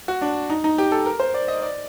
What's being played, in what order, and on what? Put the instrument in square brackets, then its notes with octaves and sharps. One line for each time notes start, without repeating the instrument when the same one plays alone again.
[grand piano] F#4
D4
D#4
D#4
G4
A4
A#4
C5
D5
D#5
D5